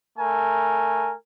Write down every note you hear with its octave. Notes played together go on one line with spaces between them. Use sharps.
A3 A#4 G#5